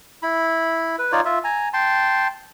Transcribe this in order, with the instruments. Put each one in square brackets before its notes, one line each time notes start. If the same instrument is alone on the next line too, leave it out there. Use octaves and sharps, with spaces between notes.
[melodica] E4 B5
B4
D#4 F4 C#5 D5
F4 E5
G#5 A#5
G5 A5 C6